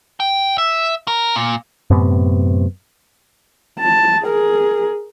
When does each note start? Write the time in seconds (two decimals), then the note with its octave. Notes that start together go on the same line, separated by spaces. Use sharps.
0.20 G5
0.58 E5
1.08 A#4
1.36 A#2
1.90 F#2 A2 C3 B3
3.79 A5
4.23 G#4 A#4